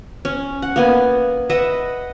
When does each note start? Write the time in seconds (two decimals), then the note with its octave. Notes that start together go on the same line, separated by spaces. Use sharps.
0.25 C#4
0.62 F#5
0.76 A#3 B3 G#5
1.50 B4 D#5 E5 F#5